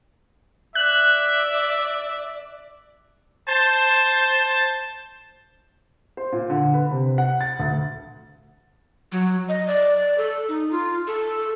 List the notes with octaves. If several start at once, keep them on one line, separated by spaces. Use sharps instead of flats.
D5 E5 F#6
C5 A5
C5
A#2
D3
B4
C3
F#5
A6
D2
F#3
D#5
D5
A4
D#4
F4
A4